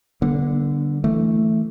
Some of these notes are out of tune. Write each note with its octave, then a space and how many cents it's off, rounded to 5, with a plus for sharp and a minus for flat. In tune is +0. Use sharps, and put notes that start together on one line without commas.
D3 -5 G3 -20 B3 -45
E3 +0 A3 +0